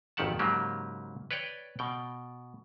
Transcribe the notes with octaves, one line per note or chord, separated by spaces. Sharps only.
G#1 F2 D#3 G4 F#5 A5
G#2 C#3 F#3 A#3 G4
B4 C#5 D5 G5
B2 G5